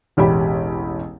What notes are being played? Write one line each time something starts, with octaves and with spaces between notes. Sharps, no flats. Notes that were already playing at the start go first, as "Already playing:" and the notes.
E1 A1 G4 B5